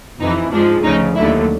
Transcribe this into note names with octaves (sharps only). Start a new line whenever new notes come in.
F2 C3 E3 D#4
G#2 F3 G#3 D4
D2 C#3 F3 D#4
D#2 D3 F#3 A3 E4